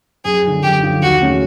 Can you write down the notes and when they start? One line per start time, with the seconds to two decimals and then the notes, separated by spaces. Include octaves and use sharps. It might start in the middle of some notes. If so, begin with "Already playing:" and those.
0.25 F#2 G#4
0.44 D3 F3
0.63 F#2 G4
0.83 D3 F3
1.02 D#2 F#4
1.21 C#3 F#3 A3 C#4